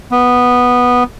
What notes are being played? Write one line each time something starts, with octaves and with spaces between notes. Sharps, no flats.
B3